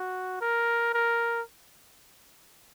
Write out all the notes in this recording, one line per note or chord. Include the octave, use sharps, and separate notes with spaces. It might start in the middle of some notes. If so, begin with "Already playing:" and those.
Already playing: F#4
A#4
A#4